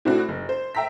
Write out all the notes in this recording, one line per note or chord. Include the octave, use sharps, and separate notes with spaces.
A2 C4 D4 F#4
F#1
C5
E5 G5 A#5 E6 B6